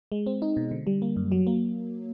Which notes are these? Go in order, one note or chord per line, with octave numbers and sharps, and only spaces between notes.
G#3
C4
D#4
B2
D3
G3
A#3
F#2
F#3
A#3